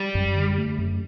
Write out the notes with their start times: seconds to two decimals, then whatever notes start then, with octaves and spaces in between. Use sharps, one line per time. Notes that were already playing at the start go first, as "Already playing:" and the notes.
Already playing: G3
0.15 F#2
0.35 D3
0.58 A3
0.78 F#2